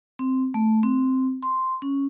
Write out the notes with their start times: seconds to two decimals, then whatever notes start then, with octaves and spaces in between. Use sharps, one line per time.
0.19 C4
0.54 A3
0.83 C4
1.43 C6
1.82 C#4